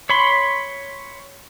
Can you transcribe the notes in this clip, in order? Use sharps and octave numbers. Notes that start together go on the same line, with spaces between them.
C#5 B5 C6